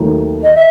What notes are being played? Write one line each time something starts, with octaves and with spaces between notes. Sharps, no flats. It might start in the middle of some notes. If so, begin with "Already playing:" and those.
Already playing: D#2 D#3 F#3 A3
D#5
E5